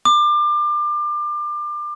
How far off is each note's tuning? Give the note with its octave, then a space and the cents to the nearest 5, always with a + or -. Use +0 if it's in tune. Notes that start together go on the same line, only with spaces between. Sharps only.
D6 +30